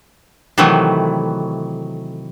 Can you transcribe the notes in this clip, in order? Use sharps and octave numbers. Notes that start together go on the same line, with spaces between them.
C3 D#3 E3 F#3 A3